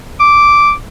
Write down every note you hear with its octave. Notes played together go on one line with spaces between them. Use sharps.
D6